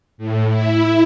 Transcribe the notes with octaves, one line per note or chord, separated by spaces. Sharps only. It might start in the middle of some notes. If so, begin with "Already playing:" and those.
A2
E4